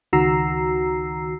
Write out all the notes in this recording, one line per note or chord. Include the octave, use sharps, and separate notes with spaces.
C#2 D#3 F#4 A#5 E6 C7